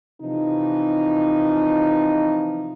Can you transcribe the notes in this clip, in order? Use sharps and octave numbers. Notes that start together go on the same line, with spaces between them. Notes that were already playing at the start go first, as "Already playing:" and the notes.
C3 E3 F3 D#4